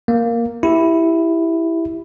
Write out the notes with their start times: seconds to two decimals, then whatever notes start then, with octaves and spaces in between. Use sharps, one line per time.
0.08 A#3
0.63 E4 G4